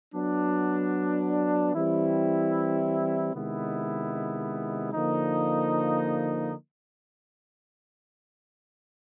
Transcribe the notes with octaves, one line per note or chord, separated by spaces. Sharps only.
F#3 B3 D4
E3 G3 C4 E4
C3 D#3 G#3 B3 E4
D3 F3 A#3 D#4